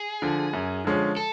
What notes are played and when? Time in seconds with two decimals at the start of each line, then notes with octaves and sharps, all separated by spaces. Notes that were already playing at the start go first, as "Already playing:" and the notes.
Already playing: G#4
0.22 D3 F3
0.53 F#2
0.85 D3 F3 G#3 C#4
1.17 A4